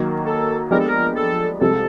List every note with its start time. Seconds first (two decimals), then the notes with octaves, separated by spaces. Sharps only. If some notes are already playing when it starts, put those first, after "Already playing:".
Already playing: D#3 F#3 A#3
0.26 A4
0.71 F3 G#3 B3 D4 G4 A#4
0.80 A4
0.88 A#4
1.16 A4
1.61 C2 C3 F3 G#3 C4 A4